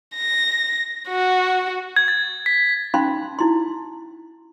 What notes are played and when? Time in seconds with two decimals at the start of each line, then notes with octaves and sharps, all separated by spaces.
0.16 A#6
1.08 F#4
1.96 G#6
2.08 A6
2.46 B6
2.94 C#4 D#4 F5 B5 C6
3.39 D#4 E4 C6